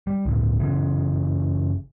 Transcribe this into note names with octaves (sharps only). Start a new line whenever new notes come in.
G3
C#2 A2
F#1 C#3 E3